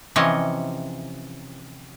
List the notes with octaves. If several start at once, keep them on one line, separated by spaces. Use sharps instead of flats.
C3 E3 F3 C#4 C#5 D#5